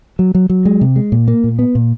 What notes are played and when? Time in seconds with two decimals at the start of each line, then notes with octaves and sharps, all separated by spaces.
0.19 F#3
0.35 F#3
0.50 F#3
0.65 G#3
0.81 C3
0.96 G#3
1.12 A#2
1.28 A#3
1.44 A#2
1.59 B3
1.75 A#2